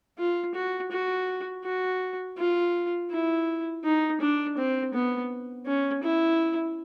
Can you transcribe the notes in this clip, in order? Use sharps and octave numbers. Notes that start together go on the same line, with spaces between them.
F4
F#4
F#4
F#4
F4
E4
D#4
D4
C4
B3
C#4
E4